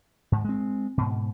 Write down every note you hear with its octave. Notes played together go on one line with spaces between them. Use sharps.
G#2
G#3 C4
G#2 B2